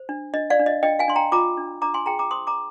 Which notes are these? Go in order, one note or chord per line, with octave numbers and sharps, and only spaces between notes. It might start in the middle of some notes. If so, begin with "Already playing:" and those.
Already playing: C5
D4
D4 D#5
D5 F5
D4
D#5
D4 D#5 G5
F5 G#5
D4 C6
G5 A#5
F4 A#5 D6
D4
D4 A#5 D6
G#5 C6
G#4 G5 A#5
A#5 D6
C5 C6 D#6
A#5 D6